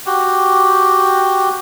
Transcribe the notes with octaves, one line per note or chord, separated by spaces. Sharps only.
F#4 G4